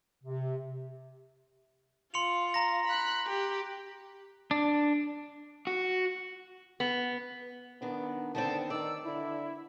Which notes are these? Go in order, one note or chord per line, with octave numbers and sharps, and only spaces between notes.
C3
F4 C6 C#7 F7
A#5 A#6
B5 F#6
G4
D4
F#4
B3
D#3 B3 D4
D3 D#3 B3 C4 A5
D#3 D5 E6
D3 E4